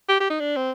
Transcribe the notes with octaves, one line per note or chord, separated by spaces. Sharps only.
G4
G4
D#4
D4
C4